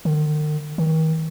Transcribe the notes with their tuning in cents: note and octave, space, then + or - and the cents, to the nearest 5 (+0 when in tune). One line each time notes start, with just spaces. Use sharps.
D#3 -45
D#3 +35